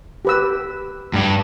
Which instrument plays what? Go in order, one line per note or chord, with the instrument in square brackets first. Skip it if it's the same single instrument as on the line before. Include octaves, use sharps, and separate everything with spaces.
[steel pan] G4 B4 E6
[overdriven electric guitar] G2 G3